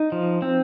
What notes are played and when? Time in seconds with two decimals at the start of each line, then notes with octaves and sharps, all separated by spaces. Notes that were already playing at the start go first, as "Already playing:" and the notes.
Already playing: D#4
0.12 F3
0.42 C4